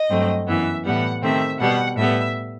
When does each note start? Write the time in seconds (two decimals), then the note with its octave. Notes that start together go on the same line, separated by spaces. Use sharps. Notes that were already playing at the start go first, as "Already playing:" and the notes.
Already playing: D#5
0.09 G2 F#3 A3 C4
0.48 F#2 E3 B3 E5
0.85 A2 E3 G3 B3 F#5
1.22 C3 D#3 A3 C4 E5
1.59 B2 G3 B3 F#5
1.97 A2 G3 B3 E5